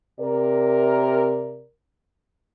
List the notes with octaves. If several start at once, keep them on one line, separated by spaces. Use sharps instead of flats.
C3 A#4 D5